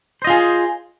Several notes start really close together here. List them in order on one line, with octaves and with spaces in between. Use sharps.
C5 D#5 F4 G#4